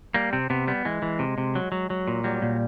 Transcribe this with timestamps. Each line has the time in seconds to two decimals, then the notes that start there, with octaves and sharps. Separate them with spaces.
0.14 G3 A#3
0.33 C3 C4
0.50 C3 B3
0.68 G3 B3
0.85 E3 G#3
1.02 E3
1.19 C3
1.38 C3
1.55 F#3
1.72 F#3
1.90 F#3
2.08 A#2
2.24 F#3 G3
2.42 A#2